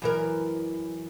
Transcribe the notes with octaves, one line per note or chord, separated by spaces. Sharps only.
F#2 E3 A#4